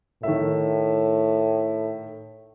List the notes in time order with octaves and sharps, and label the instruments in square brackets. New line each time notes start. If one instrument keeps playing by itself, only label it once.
[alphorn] A2 [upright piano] D#3 E5